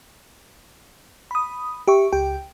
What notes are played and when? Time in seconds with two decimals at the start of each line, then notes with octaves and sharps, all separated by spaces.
1.31 B5 D#6
1.88 G4 E5 C#6
2.12 C#2 G4 G5